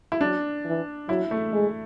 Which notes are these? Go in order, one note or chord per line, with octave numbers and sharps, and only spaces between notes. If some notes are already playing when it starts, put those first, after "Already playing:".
E4
F#3 D4
E3
F#3 E4
A3
G#3